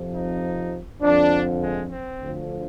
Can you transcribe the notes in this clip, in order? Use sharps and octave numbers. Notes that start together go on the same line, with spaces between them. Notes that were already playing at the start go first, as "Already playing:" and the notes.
Already playing: F2 C3 F3
D#4
F2 D3 F3 D4
G#3
C4
D2 D3 F3